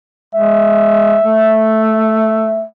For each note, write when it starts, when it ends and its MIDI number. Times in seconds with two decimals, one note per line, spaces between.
0.35 1.18 56
0.35 2.65 76
1.24 2.64 57